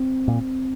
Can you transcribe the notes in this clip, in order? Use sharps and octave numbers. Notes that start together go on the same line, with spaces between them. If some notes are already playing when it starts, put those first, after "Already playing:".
Already playing: C4
A#2